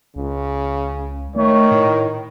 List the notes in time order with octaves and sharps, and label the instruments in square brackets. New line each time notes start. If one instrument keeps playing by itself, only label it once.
[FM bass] C#2 [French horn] C#3
[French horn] D#3 [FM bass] A3 [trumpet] C#5
[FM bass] A2